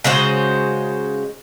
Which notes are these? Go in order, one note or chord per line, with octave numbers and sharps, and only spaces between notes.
C#3 G#3 F#4 C5